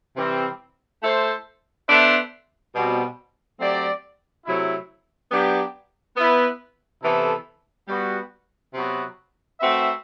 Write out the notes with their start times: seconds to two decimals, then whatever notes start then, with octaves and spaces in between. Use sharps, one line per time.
0.16 C3 E3 G3 C4
1.02 A3 E4 A4 C5
1.88 B3 D4 A4 C5 E5
2.74 B2 G3 C4
3.59 F#3 A3 C4 G4 D5
4.46 C3 F#3 A3 E4
5.31 F#3 B3 D4 G4
6.17 B3 E4 B4
7.02 C3 E3 B3 E4 A4
7.88 G3 B3 F#4
8.74 C3 F#3 B3 F#4
9.60 A3 C4 F#4 B4 E5